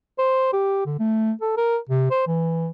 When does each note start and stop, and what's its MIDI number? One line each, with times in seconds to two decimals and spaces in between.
0.19 0.51 72
0.53 0.81 67
0.86 0.99 50
0.99 1.32 57
1.42 1.57 69
1.57 1.78 70
1.89 2.08 48
2.11 2.23 72
2.27 2.69 52